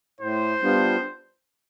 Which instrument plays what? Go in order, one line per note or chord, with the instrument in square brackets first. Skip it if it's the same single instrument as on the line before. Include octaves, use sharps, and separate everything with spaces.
[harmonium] A2 [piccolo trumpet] C5
[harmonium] G3 B3 D4 F4